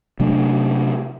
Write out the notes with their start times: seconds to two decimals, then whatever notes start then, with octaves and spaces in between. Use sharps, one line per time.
0.20 C3 F#3 A3 D4